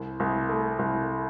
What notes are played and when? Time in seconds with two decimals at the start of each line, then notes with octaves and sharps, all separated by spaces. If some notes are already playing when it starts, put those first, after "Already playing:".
Already playing: C2
0.20 C2
0.49 A3
0.79 C2